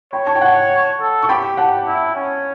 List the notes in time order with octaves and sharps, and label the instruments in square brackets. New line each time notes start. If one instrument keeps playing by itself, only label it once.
[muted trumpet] C#5 [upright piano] G5 B5
[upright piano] A5 C#6
G5
F#5 A5
[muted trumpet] A4
[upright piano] C#6
[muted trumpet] G4 [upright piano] G5 B5
[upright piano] F#5 A5
[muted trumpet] E4
C#4